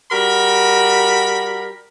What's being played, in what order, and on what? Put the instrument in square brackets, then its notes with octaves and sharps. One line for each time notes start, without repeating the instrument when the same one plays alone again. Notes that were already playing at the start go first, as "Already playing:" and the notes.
[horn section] G3 F#4 A#4 B5